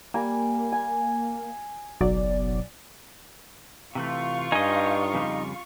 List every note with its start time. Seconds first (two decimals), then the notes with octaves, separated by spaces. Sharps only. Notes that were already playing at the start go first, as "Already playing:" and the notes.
0.14 G3 A#3 G#5
0.72 G#5
2.01 F#1 B1 F#3 D5
3.95 C3 E3 A3 F4 F5 C#6
4.52 G2 G3 D#4 D#5 G#5
5.14 F2 C#3 G3